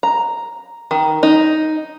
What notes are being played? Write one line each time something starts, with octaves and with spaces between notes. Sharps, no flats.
A#5
D#3
D#4